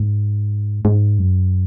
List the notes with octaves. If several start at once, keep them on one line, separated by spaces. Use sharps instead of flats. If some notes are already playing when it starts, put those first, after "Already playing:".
Already playing: G#2
G#2
F#2